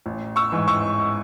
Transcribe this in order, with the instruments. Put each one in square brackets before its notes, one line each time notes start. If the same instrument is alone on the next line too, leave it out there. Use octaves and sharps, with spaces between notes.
[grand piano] A1
C#6 E6
G#2 E3
C#6 E6